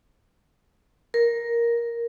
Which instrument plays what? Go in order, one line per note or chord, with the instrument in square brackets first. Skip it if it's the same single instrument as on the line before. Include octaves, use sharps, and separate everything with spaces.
[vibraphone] A#4